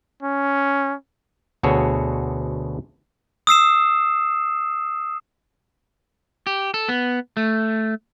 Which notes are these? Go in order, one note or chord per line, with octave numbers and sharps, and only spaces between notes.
C#4
D2 B2 F#4 G#4 A4 C#5
D#6 E6 C7 E7
G4
A4
B3
A3